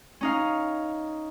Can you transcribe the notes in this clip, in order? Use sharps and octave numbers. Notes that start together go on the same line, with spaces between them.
C#4 D#4 F5